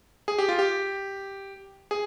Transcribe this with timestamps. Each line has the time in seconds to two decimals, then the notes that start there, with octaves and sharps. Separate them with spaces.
0.28 G#4
0.38 G4
0.49 F4
0.59 G4
1.91 G#4